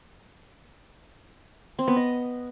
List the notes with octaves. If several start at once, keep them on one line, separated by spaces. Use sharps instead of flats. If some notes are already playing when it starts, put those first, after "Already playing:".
C4
B3
D#5